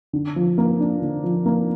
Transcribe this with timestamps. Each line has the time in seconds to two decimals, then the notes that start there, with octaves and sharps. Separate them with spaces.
0.13 D3
0.36 F3
0.58 A#3
0.80 D4
1.02 D3
1.24 F3
1.46 A#3